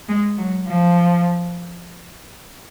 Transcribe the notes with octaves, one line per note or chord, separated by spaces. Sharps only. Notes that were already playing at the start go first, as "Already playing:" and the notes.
G#3
F#3
F3